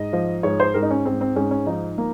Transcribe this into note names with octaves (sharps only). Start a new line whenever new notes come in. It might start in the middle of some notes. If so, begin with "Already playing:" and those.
Already playing: G#2 D#5
F3
G#2 C#5
C5
G#2 A#4
D#4
C#4
G#2 C4
C4
G#2 C#4
C#4
F3 D#4
A#3